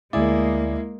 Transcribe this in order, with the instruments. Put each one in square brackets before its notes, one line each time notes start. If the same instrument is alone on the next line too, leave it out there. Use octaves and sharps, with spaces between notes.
[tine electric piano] D2 D5 [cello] G#3 A#3 [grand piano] E4 G#4